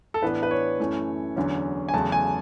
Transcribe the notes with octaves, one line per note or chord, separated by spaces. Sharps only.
A4
A2 E3 B3 D4 B4
B4
C#5
F#2 E3 A3 C#4
E2 D3 F#3 C#4
G#5
E2 C#3 F#3 A3 A5
G#5